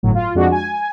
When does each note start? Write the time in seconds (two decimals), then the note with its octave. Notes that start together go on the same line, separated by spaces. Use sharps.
0.03 G1 A2 F#3
0.15 F4
0.35 F2 G#3 D4 F#4
0.52 G#5